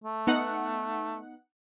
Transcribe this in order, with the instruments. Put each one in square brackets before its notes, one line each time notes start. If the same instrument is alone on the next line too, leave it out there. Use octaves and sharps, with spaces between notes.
[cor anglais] A3
[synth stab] B3 D#4 F#5